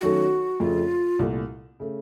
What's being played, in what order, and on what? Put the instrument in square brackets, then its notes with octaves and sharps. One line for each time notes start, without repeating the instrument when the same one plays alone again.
[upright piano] D#3 F#3 A3 C#4 A4 [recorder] F#4
[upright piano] F2 C#3 A3 [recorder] F4
[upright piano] C2 A#2 A3
C#3 A3